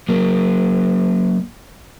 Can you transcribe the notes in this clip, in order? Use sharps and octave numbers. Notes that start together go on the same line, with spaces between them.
F#3 A#3